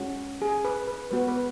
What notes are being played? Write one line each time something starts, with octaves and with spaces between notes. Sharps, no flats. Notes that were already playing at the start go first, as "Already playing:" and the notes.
Already playing: G#3 C#4 F#4
G#4
B4
B4
G#3 B3 F#4 B4
B4